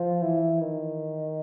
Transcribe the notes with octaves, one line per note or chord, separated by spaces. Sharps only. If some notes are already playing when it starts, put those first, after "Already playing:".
Already playing: F3
E3
D#3